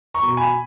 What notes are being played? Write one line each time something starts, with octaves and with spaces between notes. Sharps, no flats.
A#5 C#6
B2
G#5 B5